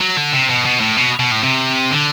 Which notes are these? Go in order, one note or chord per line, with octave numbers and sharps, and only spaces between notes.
F#3
D3
C3
B2
B2
A2
B2
B2
A2
C3
D3